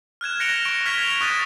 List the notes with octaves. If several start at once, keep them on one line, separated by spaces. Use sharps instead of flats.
F6 F#6 G#6 E7
F#6 A#6 C#7 D7 F7 G7
C#6 D7
F6 G#6 B6 F7 G7
F7
C#6 D#6 F#6 G#6 A6 D#7